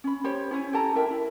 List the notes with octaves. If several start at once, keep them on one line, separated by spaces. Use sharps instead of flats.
C#4 B5
G4 C5 C#5
C#4 E4 C#5 G#5
G4 A4 A5 A#5
E4 A#4 E5 G5
E4